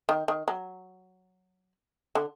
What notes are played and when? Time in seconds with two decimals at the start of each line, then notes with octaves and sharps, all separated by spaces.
0.09 D#3
0.28 D#3
0.48 F#3
2.15 D3